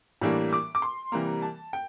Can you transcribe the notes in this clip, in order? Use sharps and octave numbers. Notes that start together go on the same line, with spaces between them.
A2 E3 G3 A#3 D4
D6
D6
C6
C3 E3 G3 A#3 A#5
A5
G5